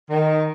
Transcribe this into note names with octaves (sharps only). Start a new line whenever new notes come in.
D#3